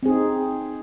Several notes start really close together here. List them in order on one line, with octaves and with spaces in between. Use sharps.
C4 G#4 D#4